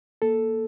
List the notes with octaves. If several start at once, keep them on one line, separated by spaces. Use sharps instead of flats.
A#3 A4